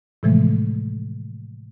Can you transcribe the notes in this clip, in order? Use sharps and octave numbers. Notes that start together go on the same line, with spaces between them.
A2 C3 E3 F3 G#3 A3